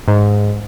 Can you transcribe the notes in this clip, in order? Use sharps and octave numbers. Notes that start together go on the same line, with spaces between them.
G#2